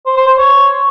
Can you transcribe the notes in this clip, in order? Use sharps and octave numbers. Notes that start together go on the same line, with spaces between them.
C5
C5
C5
C#5